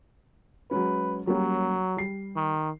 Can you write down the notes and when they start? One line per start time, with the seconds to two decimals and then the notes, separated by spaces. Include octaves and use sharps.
0.71 F#3 G#3 C#4 B4
1.27 F#3 G3 A#3 C#4
1.97 G3 C7
2.36 D#3